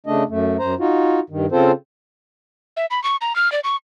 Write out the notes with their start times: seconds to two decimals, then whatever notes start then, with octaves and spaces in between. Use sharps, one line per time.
0.07 C#3 A3 D4 D#5
0.29 F#2 A3
0.59 F#2 C5 A#5
0.80 D#4 F4 F#4
1.30 G2 D#3
1.52 C#3 C4 F4 A4 C5
2.77 E5
2.91 B5
3.04 C#6
3.21 A#5
3.36 F6
3.52 D5
3.64 C#6